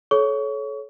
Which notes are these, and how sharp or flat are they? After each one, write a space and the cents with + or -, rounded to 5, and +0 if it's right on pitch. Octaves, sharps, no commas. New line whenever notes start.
A4 -35 C#5 +0 C#6 +30